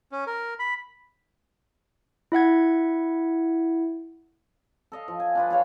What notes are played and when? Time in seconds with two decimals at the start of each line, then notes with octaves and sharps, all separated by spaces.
0.12 C#4
0.27 A#4
0.59 B5
2.32 E4 E5 F#5 G#6
4.92 A4 D#5 F5
5.08 F3
5.20 G#5
5.35 D4 F4 B4
5.50 F4 G#4 C#5 F5